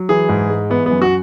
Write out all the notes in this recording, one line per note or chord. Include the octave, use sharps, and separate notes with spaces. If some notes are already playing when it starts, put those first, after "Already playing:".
Already playing: F#3
E3 G#4
G#2
G#3
E3 B3
B3
F#2
F#4